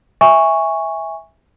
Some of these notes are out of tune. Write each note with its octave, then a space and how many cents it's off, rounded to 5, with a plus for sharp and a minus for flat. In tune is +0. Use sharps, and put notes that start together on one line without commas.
E5 -10 G#5 -20 C#6 +0